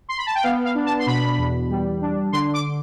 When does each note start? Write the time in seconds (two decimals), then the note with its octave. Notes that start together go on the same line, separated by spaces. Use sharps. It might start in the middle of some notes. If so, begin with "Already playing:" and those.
0.09 C6
0.18 B5
0.26 A5
0.35 G5
0.43 B3 F5
0.64 F5
0.75 D4
0.86 A5
0.99 C6
1.07 B2 B5
1.38 E2
1.70 G3
2.01 D4
2.32 D3 C6
2.54 D6